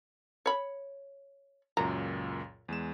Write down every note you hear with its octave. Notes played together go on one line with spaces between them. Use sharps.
C#5 B5
C#2 F#2 A#2 A#5
E2 G#3 E7